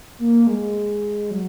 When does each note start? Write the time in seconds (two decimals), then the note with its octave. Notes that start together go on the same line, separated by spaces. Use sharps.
0.19 A#3
0.47 G#3
1.31 F#3